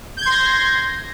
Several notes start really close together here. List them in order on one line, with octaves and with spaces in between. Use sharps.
G6 G#6 C6 A#6